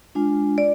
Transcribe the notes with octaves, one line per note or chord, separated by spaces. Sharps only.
G#3 D4 F4
D5